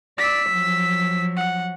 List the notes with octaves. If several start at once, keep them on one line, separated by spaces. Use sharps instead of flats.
D5 E6 B6
F3 F#3
F#5